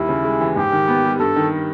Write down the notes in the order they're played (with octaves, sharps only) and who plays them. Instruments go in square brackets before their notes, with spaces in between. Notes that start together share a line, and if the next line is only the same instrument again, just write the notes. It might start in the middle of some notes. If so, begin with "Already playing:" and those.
Already playing: [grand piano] D#2 G3 [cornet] E4
[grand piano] C#3
G#3
E3
[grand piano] G#2 [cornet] G4
[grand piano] D#3
B3
G3
[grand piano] G2 [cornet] A4
[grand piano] D#3